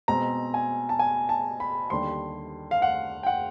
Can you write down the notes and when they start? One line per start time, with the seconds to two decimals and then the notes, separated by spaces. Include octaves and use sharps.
0.08 B2 G#3 C4 A#5
0.54 G#5
0.89 A5
0.99 G#5
1.29 A5
1.60 B5
1.90 D#2 D3 G3 C6
2.71 F5
2.82 F#5
3.23 G5
3.27 F#5